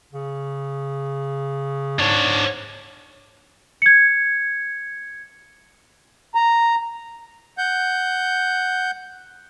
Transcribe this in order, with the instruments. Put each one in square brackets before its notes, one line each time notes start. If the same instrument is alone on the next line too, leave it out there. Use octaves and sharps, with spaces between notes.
[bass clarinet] C#3
[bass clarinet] G#2 [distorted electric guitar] D4 C#5
[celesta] G#6 C#7
[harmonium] A#5
[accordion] F#5 G6